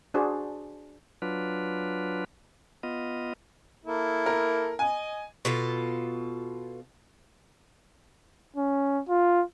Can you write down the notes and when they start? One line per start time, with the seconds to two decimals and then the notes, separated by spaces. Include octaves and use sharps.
0.14 D4 F#4 G#4 C5
1.22 F#3 D4 F4 B4
2.83 B3 F4 D#5
3.85 A#3 E4 A4
4.26 A#4
4.79 D#5 G#5
5.45 B2 F4 A4
8.56 C#4
9.08 F4